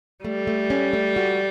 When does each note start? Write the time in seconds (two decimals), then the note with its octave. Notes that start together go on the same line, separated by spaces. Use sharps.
0.24 G3 A3
0.47 A3
0.70 C#4
0.93 A3
1.16 F#4